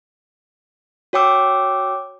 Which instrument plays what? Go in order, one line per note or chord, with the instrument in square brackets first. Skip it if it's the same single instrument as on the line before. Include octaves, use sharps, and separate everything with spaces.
[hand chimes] F#4 C#5 G5 D6 E6